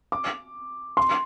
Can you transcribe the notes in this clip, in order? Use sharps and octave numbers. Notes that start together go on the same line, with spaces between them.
D6
C6